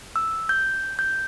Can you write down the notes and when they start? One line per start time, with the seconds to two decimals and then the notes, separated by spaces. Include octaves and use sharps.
0.16 E6
0.49 G6
0.99 G6